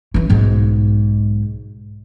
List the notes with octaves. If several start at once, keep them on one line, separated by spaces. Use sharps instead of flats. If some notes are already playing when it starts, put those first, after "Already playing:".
E3 C#4
B1 G#2